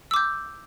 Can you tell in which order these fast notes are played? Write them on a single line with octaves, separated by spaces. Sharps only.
E6 D6 G6